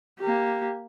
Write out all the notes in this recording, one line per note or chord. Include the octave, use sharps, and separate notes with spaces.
A#3 G4